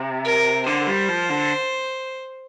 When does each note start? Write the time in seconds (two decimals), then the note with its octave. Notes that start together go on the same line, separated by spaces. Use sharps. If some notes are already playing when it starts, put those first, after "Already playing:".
Already playing: C3
0.25 A#4
0.66 D3 C5
0.87 G3
1.08 F3
1.29 D3